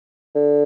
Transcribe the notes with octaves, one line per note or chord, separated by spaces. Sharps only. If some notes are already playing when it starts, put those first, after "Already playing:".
D3